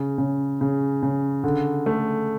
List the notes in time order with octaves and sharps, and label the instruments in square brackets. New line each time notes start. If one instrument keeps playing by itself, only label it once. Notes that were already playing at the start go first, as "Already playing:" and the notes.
Already playing: [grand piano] C#3
C#3
C#3
C#3
D3
A3